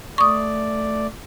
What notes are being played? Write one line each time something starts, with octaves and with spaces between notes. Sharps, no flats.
A3 D5 C#6 D#6